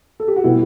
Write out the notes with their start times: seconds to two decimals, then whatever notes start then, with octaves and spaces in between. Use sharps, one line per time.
0.20 A4
0.28 G4
0.36 F#4
0.44 B2 G3 B3 E4